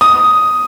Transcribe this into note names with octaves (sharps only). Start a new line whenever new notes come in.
D#6